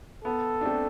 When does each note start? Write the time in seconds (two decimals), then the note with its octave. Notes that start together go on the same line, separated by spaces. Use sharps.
0.25 B3 A4
0.61 D4
0.65 A3 C4